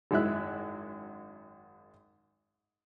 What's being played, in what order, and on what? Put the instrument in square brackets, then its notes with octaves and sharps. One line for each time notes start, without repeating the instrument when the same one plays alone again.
[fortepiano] G#1 F#2 G#3 E4 E5 F#6